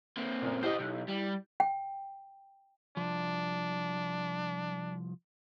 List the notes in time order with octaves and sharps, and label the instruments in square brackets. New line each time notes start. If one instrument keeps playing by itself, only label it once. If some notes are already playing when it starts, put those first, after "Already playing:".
[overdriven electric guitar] A#3 C4
[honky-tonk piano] F#2 A#2
[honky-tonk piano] E4 G4 G6 [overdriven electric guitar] C5 D#5
[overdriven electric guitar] B1
G3
[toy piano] G5
[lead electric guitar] C2 F3 [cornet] D4